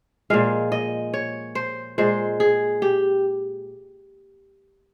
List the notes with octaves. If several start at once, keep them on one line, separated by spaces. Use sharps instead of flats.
A#2 F3 G#3 F5
D#5
C#5
C5
A#2 G#3 C5
G#4
G4